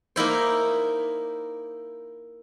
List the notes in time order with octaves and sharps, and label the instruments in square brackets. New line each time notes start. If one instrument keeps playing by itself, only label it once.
[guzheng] A#3 D#4 E4 C5